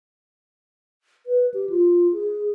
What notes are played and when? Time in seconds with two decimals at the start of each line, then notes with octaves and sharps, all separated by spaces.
1.26 B4
1.54 G4
1.70 F4
2.13 G#4